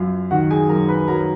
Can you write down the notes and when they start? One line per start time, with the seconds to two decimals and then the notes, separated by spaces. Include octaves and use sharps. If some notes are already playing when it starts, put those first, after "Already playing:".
Already playing: F#2 F#3 F4 F#4 F5
0.31 D#3 F#4 F#5
0.50 G#4 G#5
0.69 F#2 A#4 A#5
0.89 B4 B5
1.07 F#3 A#4 A#5